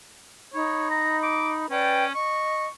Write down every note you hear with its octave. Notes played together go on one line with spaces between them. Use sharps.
D#4 C#5 B5
A#5
D6
C#4 B4 D5 G5
D#5 C#6